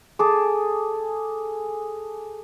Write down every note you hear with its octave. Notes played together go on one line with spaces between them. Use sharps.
G#4 A4 A5 D6